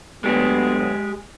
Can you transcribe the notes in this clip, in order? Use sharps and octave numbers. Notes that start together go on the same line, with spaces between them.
D2 F#3 G#3 B3 G4 G#4